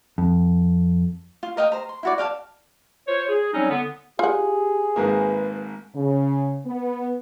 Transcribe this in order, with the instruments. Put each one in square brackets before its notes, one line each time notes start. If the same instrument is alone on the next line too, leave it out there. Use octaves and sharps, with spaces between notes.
[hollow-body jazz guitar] F2
[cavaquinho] F4
A#4 D#5 F5 G5
C5 A#5
C6
E4 F#4 D5
D5 F5 G5 A5
[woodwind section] F4 C5 C#5
G#4
F#3 G3 C4 C#4 D#4
D3 B3
[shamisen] F4 F#5 [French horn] G4 [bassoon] G#4
[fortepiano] G#1 G#2 A#3 [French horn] B4
[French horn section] C#3
B3